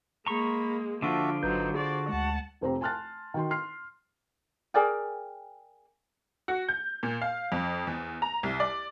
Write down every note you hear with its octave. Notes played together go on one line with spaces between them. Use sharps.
G#3 A#3 A#5 B5 C#6
D3 F3 D4 F4 F#4 A4 E5
G1 F#3 D#4 B4 C5 G6
F#4 G#4 C5 D5
D2 G#3 F#5 A5
F1 F2 C4 G4 C5 A#5
G#5 A5 C6 F6 F#6 A6
D#3 F#4 G5 C6
C6 F6 C7
G#4 A#4 D5 G5
F#4
G6
A#2
F5
F2
E2
A#5
C2
D5